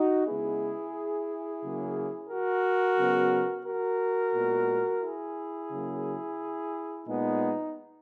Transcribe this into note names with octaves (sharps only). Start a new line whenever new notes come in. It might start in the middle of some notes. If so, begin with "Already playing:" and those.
Already playing: D#4 F#4
C#3 G#3 B3 E4 G#4
C#3 F#3 A#3
F#4 A#4
C#3 F#3 B3
F#4 A#4
A#2 G#3 B3
E4 G#4
C#3 F#3 A#3
A#2 G#3 B3 D#4